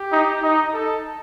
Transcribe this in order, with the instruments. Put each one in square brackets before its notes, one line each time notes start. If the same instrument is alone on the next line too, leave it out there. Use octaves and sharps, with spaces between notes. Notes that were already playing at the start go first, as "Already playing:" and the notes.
Already playing: [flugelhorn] G4
[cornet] D#4
D#4
[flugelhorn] A4